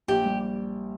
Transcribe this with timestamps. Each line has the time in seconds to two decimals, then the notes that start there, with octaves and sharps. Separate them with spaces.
0.08 A#1 G4
0.25 G3